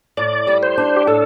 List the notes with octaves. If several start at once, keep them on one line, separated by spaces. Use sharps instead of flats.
A2 D5
G3
C5
D4
G4
A2 A4